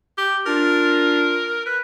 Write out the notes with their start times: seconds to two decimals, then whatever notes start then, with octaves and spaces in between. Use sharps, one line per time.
0.18 G4
0.46 D4 F4 A#4
1.66 B4